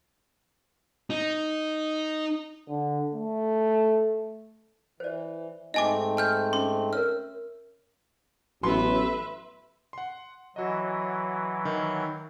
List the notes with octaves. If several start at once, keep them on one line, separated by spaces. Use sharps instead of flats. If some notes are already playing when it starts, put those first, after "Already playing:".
D#4
D3
A3
E3 C5 D5
G#2 A3 C4 D#4 D#5 G#5 D6
G#5 F6 G6
C#4 C6 D6
A#4 C#5 E5 F6
A1 F#3 B3 B4 E5 C6
F#5 C6
E3 F#3 F#4 D#5
D#3